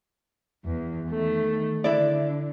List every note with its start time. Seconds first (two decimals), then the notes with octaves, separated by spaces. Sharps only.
0.63 E2
1.09 D#3 A3
1.84 D3 D4 E4 D5